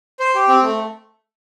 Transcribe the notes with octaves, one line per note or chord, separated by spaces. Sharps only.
C5
G4
C4
A3